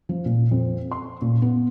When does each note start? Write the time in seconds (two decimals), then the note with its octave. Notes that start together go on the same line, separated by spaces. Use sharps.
0.09 F3
0.26 A#2
0.51 F2
0.91 C6
1.22 A#2
1.42 B3